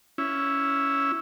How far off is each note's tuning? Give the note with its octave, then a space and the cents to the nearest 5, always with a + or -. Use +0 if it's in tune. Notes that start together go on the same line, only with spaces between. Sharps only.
C#4 +10 E4 +0